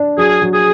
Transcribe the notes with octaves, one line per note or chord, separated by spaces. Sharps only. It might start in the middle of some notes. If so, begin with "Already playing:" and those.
Already playing: D4
F#3 G#4
F#3
G#4